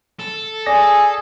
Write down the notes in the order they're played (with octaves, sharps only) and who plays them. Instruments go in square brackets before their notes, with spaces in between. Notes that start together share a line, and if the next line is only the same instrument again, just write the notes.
[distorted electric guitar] A4
[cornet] G#4 [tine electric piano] D5 A#6